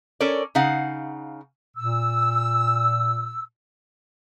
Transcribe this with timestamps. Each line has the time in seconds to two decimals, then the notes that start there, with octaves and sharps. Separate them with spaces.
0.20 C#4 A4 A#4 C#5 D5
0.55 C#3 D#4 F5 F#5
1.77 A#2 E6